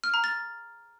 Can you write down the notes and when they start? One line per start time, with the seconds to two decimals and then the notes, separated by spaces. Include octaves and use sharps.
0.04 F6
0.14 A#5
0.24 A6